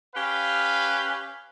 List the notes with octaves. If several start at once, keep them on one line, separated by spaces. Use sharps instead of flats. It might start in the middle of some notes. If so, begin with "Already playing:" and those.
C#4 G4 B4 F5